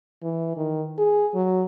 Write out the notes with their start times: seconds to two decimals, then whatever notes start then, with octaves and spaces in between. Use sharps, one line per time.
0.22 E3
0.57 D#3
0.98 G#4
1.34 F#3